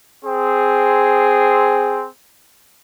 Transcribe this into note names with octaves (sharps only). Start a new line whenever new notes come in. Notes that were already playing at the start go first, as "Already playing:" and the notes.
C4 G#4